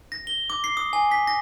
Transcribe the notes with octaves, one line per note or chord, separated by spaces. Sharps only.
A#6
G7
D6
C7
D#6
G#5
B6
A#6